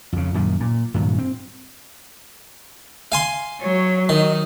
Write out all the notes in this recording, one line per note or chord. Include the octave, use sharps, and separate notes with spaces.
F2 C#3
F#2 A#2 D#3
A#2
G2 A#2 D#3 F#3
C4
F5 G#5 C6
F#3 C#5
D#3 D#4